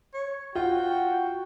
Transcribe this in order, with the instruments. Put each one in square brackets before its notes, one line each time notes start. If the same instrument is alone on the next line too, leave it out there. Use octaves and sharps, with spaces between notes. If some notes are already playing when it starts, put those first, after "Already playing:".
[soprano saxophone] C#5
[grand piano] F4 [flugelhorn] F#4 [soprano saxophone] G5